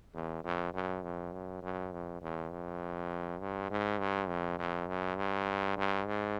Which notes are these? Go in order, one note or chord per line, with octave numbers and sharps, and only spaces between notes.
E2
F2
F#2
F2
F#2
F#2
F2
E2
F2
G2
G#2
G2
F2
F2
F#2
G2
G2
G#2